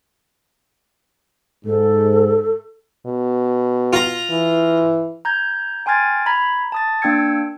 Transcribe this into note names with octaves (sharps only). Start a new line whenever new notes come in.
G#2 A4
B2
F4 A#5
E3
A#5 G6 G#6
G5 G#5 C6 F6 G#6 A6
A#5 B5 G#6 B6
A5 D#6 A6
A#3 D4 G5 E6 G#6 C#7